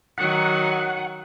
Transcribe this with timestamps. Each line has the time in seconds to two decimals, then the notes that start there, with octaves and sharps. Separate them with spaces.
0.18 D#3 F#3 F#5